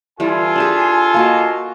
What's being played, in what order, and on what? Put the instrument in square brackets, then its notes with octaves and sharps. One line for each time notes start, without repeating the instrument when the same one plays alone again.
[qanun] E3 G3 [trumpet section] F4 A4 G#5
[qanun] D4 G4 G#4
A#3 F#4 D#5